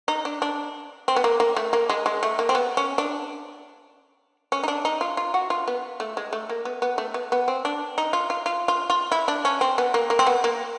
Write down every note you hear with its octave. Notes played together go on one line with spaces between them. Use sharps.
D#4
D4
D4
C4
B3
A#3
A#3
A3
A#3
G#3
G#3
A3
A#3
C4
B3
C#4
D4
C#4
D#4
D4
D#4
F4
F4
F#4
F4
B3
A3
G#3
A3
A#3
B3
B3
A3
B3
B3
C4
D4
D#4
F4
F4
F4
F4
F4
E4
D4
C#4
C4
B3
A#3
A#3
C4
B3
A#3